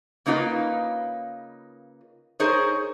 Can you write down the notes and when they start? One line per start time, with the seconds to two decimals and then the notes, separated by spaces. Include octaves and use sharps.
0.26 C#3 A#3 D#4 F4 B4 F5
2.40 D#4 G#4 A#4 C5 C#5